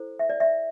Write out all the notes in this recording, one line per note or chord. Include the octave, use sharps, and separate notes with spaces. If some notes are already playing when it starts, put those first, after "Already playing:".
Already playing: E4 A4 C5
E5
D5
E5